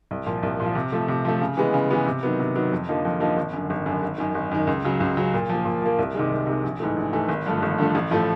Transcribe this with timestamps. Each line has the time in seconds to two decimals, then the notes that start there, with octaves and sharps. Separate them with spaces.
0.11 C2
0.26 A#2 F3
0.43 C2
0.60 A#2 F3
0.75 C3
0.92 F3 A3
1.08 C3
1.25 F3 A3
1.41 C#3
1.57 E3 G#3 B3
1.74 C#3
1.90 E3 G#3 B3
2.06 C3
2.23 D#3 F#3 B3
2.40 C3
2.55 D#3 F#3 B3
2.72 F2
2.89 D3 F3 A#3 D#4
3.05 F2
3.20 D3 F3 A#3 D#4
3.37 G#1
3.53 F#2 D3
3.70 G#1
3.86 F#2 D3
4.02 G#1
4.18 F#2 D#3
4.35 G#1
4.51 F#2 D#3
4.67 C#2
4.84 C#3 F#3
5.00 C#2
5.17 C#3 F#3
5.34 A#2
5.49 F3 A#3
5.65 A#2
5.82 F3 A#3
5.99 C2
6.15 C3 D#3 G#3
6.31 C2
6.47 C3 D#3 G#3
6.63 A#1
6.80 G#2 E3 A3
6.96 A#1
7.13 G#2 E3 A3
7.28 G#1
7.46 G2 D3 F3 A3
7.62 G#1
7.78 G2 D3 F3 A3
7.95 A1
8.11 A2 F3 A3